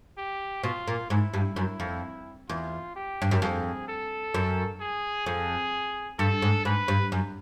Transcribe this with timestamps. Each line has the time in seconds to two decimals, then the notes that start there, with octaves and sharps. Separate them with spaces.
0.18 G4
0.63 B2 F4
0.88 A#2
1.10 G#2 E4
1.34 G2
1.56 F#2
1.80 F2
2.49 E2 F4
2.96 G4
3.22 G2
3.31 F#2
3.42 F2 G#4
3.88 A4
4.34 F#2
4.80 G#4
5.26 F2 G#4
6.19 G2 A4
6.42 G#2
6.65 G#2 B4
6.88 G2
7.12 F#2